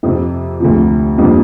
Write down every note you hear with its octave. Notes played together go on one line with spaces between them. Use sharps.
F2 C3 F3
D2 C3 F3
F2 C3 G3 A#3 D4